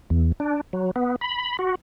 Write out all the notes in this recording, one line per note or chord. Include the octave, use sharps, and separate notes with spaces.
E2
D4
F#3
B3
B5
F#4